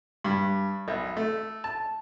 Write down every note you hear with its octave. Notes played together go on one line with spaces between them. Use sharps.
G2
B1
A3
A5